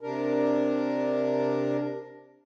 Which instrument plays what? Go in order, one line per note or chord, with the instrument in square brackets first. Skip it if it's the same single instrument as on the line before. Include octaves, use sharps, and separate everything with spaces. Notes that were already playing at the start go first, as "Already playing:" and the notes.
[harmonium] C3 D4 A#4